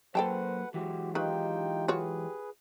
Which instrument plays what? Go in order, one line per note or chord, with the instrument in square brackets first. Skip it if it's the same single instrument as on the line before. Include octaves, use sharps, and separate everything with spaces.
[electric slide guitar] F#3 A#3 [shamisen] A4 G5 A5 [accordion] B4 F#5 [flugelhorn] C5
[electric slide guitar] E3 F#3 G#3 [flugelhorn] F#4 [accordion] G4
[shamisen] D#3 B4 [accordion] D#4 F4 G5 [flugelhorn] G4
[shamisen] F4 F#4 C#5 [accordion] G#4 B4